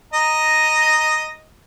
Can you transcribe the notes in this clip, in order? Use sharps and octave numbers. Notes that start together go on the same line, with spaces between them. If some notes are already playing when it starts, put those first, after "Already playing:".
D#5 A#5